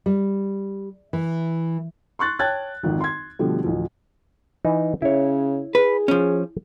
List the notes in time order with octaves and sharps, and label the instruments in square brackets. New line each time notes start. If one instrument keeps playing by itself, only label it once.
[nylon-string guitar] G3
E3
[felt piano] C6 C#6 F#6 A6
C#5 G5 A5 F#6 G#6 A6
G#1 F2 D#3
C6 G#6
B2 D3 F3 G3 A3
A1 D2 F3
[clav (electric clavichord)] E3 D#4
[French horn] C#3 [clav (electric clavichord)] E4 C#5
[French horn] G#4 [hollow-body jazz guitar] B4
[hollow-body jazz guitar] F3 C#4